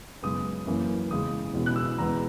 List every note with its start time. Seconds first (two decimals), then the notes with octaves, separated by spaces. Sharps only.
0.23 F#2 C#3 G#3 B3 D#6
0.67 F#2 E3 A#3 C#4
1.10 E2 C#3 G#3 D#6
1.54 E2 B2 G#3 C#4
1.66 F#6
1.76 E6
1.98 E2 B2 G#3 B3 A#5